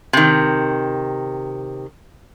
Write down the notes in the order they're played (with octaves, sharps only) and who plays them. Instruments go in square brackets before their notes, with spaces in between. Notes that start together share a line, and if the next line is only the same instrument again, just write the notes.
[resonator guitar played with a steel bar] C3 D#3